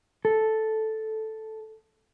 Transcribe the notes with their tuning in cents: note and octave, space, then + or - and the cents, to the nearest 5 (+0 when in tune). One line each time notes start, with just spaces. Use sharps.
A4 -5